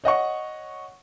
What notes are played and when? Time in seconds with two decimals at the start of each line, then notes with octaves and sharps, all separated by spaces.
0.04 C#5 D#5 F#5 C#6